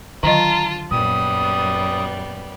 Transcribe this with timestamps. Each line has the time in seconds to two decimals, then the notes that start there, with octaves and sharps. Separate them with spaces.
0.23 D3 D#3 F#3 F4 D#5 A5 A#5
0.91 F#2 A#2 G3 B3 D#6